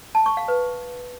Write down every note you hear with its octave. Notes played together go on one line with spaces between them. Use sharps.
A5
C#6
F5
B4